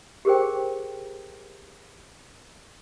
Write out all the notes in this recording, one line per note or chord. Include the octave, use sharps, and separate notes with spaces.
G4 G#4 A#4 C5 G5